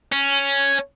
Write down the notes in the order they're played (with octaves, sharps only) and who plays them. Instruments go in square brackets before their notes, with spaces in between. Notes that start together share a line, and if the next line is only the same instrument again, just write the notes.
[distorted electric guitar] C#4